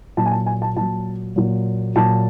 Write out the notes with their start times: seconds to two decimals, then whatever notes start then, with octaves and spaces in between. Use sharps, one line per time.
0.17 A#2 F#3 A5
0.26 G#5
0.32 A5
0.46 G#5
0.62 A5
0.76 A#2 F#3 A5
1.36 A#2 F#3
1.96 A#2 F#3 A5